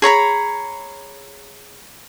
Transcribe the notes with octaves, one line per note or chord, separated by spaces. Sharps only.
G#4 C#5 A#5 B5